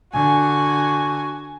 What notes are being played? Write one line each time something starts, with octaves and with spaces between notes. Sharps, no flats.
D3 F#4 G#5